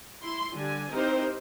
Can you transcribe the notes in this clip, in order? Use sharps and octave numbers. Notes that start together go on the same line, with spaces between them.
E4 C6
D3 G3 G#5
C4 D#4 E4 G4 A#4 C5